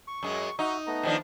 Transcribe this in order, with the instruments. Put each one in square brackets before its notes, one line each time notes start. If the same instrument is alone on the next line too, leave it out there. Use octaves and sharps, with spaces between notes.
[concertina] C#6
[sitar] F#2 G#3
[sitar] D#4 [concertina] F#4 E5
[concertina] A3 B3 A#5
[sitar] D#3 F3 D4